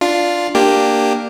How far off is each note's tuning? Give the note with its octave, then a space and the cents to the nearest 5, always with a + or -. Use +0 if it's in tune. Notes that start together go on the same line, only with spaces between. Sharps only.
D4 +0 F4 +0
A#3 +0 D4 +15 G4 +0